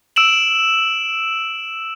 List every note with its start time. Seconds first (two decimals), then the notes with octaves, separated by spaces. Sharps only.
0.16 E6 D7 E7 F#7